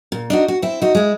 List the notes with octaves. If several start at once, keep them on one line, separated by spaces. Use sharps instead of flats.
A#2
D4 D#4 F#4
F#4
C4 E4
D#4 F#4
G#3 E4